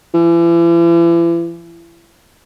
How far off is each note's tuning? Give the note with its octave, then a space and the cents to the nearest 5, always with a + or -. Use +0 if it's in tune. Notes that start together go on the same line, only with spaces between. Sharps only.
E3 +40